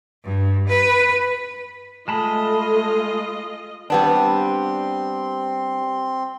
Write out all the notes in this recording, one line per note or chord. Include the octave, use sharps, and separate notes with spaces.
G2
B4
G#3 A3 F4 D#5 A5 B5
G3 B3 C4 D4 C6